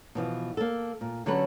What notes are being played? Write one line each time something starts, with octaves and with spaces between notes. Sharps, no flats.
B2 E3 F3
A#3 A4
A#2
D3 F#3 C#4 G4 A4 B4